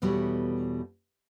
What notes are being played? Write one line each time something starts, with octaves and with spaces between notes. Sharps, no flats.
E2 B2 G3 A3 E4 C#5